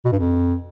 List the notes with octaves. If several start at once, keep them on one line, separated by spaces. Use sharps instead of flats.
B2
G2
F2